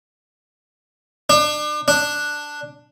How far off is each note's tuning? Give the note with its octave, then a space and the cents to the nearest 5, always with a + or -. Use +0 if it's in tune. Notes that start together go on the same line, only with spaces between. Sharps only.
D4 +35
D4 +5